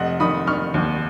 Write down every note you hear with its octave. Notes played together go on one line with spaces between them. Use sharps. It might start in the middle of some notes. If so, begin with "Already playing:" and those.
Already playing: F1 D#5 F#5
D#3 B5 D#6
D#3 C#6 F6
D#2